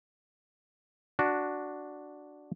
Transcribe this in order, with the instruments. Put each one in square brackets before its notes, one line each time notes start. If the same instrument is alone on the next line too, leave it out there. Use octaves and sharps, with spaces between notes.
[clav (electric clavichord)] D4 F#4